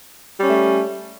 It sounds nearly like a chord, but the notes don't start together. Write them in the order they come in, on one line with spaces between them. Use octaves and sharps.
G3 C#4 A3